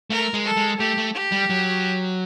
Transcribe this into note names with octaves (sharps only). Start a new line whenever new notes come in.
A3 A#4
G#3
A4
G#3
A3 G4
A3
G4
G3
F#3